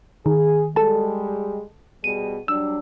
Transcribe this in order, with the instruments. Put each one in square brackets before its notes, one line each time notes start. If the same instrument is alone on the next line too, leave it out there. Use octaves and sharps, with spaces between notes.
[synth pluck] D#3 [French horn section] G#4
[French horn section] G3 G#3 [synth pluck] A4 A5
[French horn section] B2 G3 G#4 [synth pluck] D#7
[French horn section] F#3 G3 D4 [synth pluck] E6